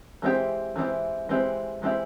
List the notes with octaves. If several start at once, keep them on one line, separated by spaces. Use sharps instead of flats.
E3 G#3 C4 E4 G4
E3 G#3 C4 E4 G4
E3 G#3 C4 E4 G4
E3 G#3 C4 E4 G4